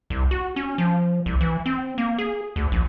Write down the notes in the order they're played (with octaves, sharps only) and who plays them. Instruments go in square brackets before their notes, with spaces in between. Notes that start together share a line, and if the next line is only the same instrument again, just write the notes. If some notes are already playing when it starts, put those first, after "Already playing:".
[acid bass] C2
F#4
C#4
F3
C2
E3
C4
A#3
G#4
D2
A#1